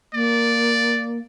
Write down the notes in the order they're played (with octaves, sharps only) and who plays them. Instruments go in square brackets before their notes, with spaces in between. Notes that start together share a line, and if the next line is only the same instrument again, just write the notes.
[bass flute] A#3 [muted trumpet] D5